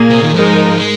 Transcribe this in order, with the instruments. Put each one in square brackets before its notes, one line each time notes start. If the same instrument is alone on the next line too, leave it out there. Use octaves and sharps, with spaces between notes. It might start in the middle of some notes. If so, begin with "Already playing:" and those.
Already playing: [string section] A#2 A#3 G#4
[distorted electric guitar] C3
D#3
[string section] G#2 G#3 D#4 A#4 [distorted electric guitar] F3
[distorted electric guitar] G#3